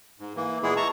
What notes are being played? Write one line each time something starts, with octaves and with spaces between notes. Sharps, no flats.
G#2
E3 A#3
A#2 E3 G#3 B3 E4 G#4
A5 A#5 C#6